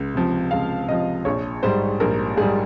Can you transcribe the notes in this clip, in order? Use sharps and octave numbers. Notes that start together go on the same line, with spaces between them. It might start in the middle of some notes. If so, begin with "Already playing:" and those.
Already playing: C#2
C3 F3
C#2 F5
C3 F3 D#5
A#1 C#5
G#2 G3 C5
A#1 A#4
G#2 G3 G#4